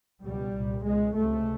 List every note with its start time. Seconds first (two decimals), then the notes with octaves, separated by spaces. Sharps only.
0.22 C#2 B2 G3
0.54 C2 A#2
0.84 C#2 B2 G#3
1.15 C#2 C3 A3